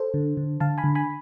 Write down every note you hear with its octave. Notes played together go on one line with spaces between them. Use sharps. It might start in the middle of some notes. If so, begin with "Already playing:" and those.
Already playing: A4 C5
D3
D3
D3 F5 A5
G#5 B5
D3
G#5 B5